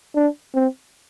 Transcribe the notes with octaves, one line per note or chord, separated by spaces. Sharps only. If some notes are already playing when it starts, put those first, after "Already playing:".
D4
C4